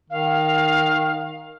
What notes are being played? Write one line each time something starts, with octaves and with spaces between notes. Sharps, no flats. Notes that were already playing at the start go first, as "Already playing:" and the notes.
D#3 F5